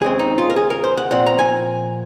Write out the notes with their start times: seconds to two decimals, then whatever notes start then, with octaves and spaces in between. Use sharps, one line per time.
0.01 D#2 C#3 G#3 C4 G#4
0.19 D#4
0.38 F4
0.50 A#4
0.56 G#4
0.70 A#4
0.84 C5
0.97 F#5
1.11 A#2 F3 C4 F#5
1.26 A#5
1.39 G#5